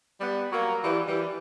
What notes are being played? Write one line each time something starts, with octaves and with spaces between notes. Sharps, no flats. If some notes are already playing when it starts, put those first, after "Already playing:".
G3 B3
F#3 A#3
E3 G3
E3 G3